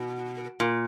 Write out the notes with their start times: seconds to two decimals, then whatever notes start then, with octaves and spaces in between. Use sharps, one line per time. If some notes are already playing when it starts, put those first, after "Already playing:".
Already playing: B2
0.60 A#2